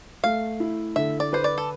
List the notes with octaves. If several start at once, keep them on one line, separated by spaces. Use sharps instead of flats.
A3 F5
E4
D3 E5
D5
B4 C5
D5
A4